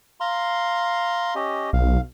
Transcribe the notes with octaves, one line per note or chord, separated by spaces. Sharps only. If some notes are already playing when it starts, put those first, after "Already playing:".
F5 A#5 C6
C#4 G4 D#5
B1 F5